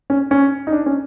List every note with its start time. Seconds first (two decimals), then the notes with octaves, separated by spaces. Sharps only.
0.10 C#4
0.31 C#4
0.67 D#4
0.72 D4
0.86 C#4